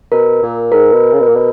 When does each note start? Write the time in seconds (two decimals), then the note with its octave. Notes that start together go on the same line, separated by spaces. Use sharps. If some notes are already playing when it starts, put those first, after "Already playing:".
0.12 B2 A#4
0.43 A#2
0.72 G#2 A#4
0.93 B2
1.12 C#3
1.20 B2
1.28 A#2
1.35 B2